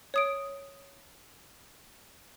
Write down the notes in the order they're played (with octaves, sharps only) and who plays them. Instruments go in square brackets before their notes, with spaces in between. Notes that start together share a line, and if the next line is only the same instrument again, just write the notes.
[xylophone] C#5 D#6 D7